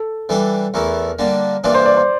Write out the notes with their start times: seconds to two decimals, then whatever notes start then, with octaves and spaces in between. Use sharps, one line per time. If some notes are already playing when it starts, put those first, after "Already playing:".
Already playing: A4
0.29 E3 G3 D4 G4 A4
0.74 E2 E3 A3 E4 A#4
1.19 D3 G3 A#3 D4
1.64 G2 E3 A#3 D4 F4 D5
1.74 C5
1.86 D5
1.97 C5